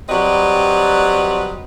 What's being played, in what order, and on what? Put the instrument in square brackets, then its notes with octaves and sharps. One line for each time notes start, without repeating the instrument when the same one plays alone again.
[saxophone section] F#3 G3 C4 B4 D5 D#5